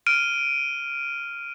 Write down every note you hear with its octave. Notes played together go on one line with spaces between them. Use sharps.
F6 D7 D#7